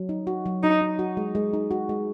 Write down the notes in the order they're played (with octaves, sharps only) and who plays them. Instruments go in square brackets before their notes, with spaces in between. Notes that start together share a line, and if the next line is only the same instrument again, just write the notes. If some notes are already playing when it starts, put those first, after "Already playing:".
Already playing: [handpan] F#3
D#4
F#4
F#3
[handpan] F#3 [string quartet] D#4
[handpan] D#4
F#4
G#3
G#3
D#4
F#4
G#3